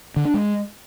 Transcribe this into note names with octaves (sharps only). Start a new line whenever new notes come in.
D3
D4
G#3